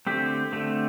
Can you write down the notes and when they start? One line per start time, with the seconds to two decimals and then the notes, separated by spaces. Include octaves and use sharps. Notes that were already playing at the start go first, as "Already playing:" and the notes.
0.07 D3 A3 C4 G4
0.52 D3 A3 C4